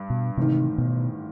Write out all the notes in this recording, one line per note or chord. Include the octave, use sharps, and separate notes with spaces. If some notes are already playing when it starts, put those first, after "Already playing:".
Already playing: G2
B2
A1 G#2 C3 D#3
B2